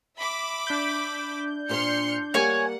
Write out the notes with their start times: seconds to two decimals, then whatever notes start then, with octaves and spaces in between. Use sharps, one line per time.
0.17 E5 B5 D6
0.67 D4 G6
1.69 A#2 C5 C6 F6 C#7
2.34 G3 A#3 C#5 F#5 G#5